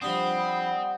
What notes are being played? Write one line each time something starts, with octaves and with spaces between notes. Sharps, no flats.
F3 G3 C4 D4 F#5 B5 D#6